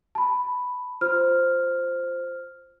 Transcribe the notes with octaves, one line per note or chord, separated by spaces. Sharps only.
A5 B5
F4 C5 F6